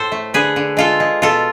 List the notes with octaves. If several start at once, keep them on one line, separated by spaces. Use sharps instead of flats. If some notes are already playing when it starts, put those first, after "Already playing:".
Already playing: A2 A4 C5
A3
D3 G#4 B4
D3
G#3 F4 A4
G#3
B2 F4 A4